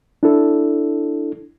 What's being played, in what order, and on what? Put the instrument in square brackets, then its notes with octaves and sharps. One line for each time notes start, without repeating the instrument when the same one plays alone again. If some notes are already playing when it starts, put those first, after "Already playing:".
[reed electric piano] D4 E4 A4